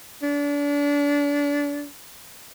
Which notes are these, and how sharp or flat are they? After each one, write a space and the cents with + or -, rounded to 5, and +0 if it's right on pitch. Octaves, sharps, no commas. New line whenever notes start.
D4 -30